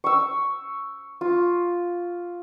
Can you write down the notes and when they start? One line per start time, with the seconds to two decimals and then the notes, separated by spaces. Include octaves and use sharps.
0.04 C#6 E6
1.21 F4